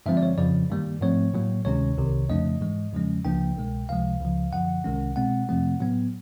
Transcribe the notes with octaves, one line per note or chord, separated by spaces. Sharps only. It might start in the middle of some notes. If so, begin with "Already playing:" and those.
G2 D3 F3 G#3 C4 E5
D5
C#5
F2 C#3 F3 D5
G2 D#3 G3 A#3
G#2 F3 A3 C4 C#5
A2 F#3 A#3
D2 C3 D#3 G#3 C#4 C#5
C2 C3 D#3
F2 C#3 F3 A3 D4 D#5
G#2 E3 G#3
E2 C#3 F3 G#3 C#4
C#2 C#3 F3 A#3 D4 G5
C2 B2 G#3
C#2 C3 F3 G#3 F5
C#2 C#3 F3
F#2 D3 F3 F#5
C2 C3 D#3 G#3 C#4
B2 G#3 C4 F#5
F2 C3 F3 A3 C4
A2 F#3 B3